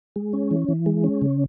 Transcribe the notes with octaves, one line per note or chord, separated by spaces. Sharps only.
G#3
C#4
E3
E3
G#3
C#4
C#3